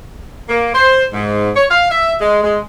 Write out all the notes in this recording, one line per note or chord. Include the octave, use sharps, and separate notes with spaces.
A#3
C5
G#2
C#5
F5
E5
G#3
G#3